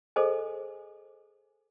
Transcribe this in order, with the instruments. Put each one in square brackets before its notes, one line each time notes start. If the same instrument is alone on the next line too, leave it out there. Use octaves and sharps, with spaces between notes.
[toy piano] G#4 A4 C5 D#5 G#5